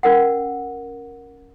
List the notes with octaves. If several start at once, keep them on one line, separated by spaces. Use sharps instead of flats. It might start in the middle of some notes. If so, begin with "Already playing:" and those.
C#4 A#4 F#5